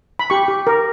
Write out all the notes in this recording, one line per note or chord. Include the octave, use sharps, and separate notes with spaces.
B5
G4 C#6
G4
A#4